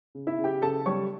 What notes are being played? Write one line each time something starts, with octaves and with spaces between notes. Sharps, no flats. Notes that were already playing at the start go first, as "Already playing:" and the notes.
C#3
E4 E5
C#3
G4 G5
C#3 A4 A5
G3 C#5 C#6